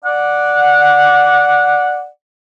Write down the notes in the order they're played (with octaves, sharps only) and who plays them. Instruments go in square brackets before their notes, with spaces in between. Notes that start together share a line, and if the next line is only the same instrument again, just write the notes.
[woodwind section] D5 F#5